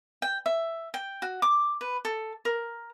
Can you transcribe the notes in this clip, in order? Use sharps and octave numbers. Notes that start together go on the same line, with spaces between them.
G5
E5
G5
F#4
D6
B4
A4
A#4